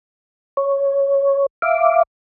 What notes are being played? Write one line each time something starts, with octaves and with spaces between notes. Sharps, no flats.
C#5
E5 F5 D6